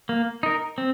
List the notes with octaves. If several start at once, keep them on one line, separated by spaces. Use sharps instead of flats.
A#3
D#4 A#4
C4